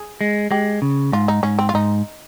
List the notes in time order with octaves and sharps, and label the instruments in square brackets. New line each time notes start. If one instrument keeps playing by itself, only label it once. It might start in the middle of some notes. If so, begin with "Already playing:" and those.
Already playing: [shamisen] G#4
[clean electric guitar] G#3
[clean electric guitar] G#3 [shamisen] G4
[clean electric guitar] C#3
[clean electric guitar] G#2 [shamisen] F4
[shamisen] D#4
[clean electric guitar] G#2 [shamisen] C#4
[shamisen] C4
F4
[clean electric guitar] G#2 [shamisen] D#4